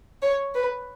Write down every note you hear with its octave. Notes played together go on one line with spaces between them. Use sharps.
C#5
B4